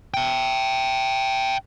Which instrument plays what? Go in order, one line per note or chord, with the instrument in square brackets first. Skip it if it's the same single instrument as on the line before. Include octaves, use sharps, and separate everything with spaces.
[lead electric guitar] E5 G5